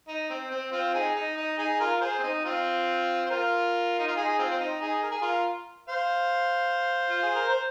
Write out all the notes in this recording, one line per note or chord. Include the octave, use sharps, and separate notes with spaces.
D#4
C4
C4
C4 F4
D#4 G#4
D#4
D#4
D#4 G#4
F4 A#4
G#4 C5
C4
D#4
C4 F4
C5
F4 A#4
D#4
F4
D#4 G#4
C4 F4
C4
D#4
D#4 G#4
A#4
G#4
F4 A#4
C5 F5
F4
G#4
A#4
C5